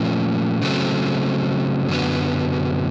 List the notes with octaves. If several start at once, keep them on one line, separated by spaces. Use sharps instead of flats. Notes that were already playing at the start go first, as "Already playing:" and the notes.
Already playing: A#2 F3 A3 C#4 F4
C#3 F#3 A3 C4
F#2 D3 F#3 B3